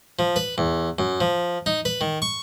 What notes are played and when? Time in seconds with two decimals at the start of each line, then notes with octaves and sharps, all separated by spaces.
0.19 F3
0.36 B4
0.58 E2
0.99 F#2
1.20 F3
1.66 D#4
1.85 B4
2.01 D#3
2.22 C#6